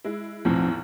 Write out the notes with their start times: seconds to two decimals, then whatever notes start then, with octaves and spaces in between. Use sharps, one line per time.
0.04 G#3 E4
0.45 B1 E2 A2 F3 C4